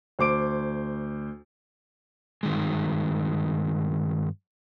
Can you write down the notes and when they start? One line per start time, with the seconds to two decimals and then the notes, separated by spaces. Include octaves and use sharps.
0.19 D2 C5 D6 D7
2.43 G2 D#3 G#3